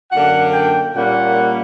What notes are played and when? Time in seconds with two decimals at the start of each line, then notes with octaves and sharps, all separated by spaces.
0.12 F#2 D3 A#3 D4 F#5
0.53 G5
0.95 A#2 G3 A#3 C#4 F#5